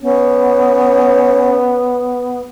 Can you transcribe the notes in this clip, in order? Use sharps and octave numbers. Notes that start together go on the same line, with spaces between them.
B3 C#4